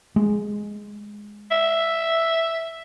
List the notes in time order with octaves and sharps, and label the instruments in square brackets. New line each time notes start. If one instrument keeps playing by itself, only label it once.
[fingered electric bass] G#3
[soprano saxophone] E5